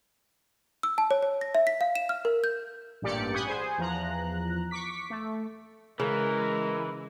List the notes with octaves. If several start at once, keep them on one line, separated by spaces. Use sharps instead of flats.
E6
A5
C#5
C#5
A#6
E5
B6
F5
E7
F6
A#4
G6
A1 G2 A#2 G4 D5 C#7
F#5 G#5 B5 C#6 D#6 G6
G#4 C5 G#5
E2 F3 A#5 F#6
C#6 D6 B6
A3
C#3 E3 G#3 A#4